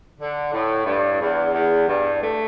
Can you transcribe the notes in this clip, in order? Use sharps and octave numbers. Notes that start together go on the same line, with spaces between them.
D3
A2
G2
E2
E2
G2
A3